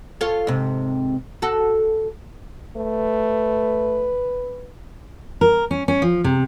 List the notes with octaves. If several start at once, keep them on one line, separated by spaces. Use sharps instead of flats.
F4 A4 C#5
G#2 C3
F#4 A4
A3 B4
A#4
C#4
C#4
F3
C3